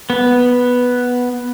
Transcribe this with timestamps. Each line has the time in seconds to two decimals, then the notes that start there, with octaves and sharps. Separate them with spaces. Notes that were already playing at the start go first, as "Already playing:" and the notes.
0.10 B3